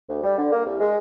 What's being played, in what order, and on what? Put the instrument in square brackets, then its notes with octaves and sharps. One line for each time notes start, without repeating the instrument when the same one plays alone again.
[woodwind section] D2
G3
D3
A#3
C2
G#3